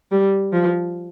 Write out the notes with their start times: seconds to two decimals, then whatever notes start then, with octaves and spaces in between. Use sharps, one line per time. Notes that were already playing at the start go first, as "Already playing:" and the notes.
0.11 G3
0.53 F3